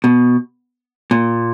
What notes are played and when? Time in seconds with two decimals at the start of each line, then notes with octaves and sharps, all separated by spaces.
0.04 B2
1.11 A#2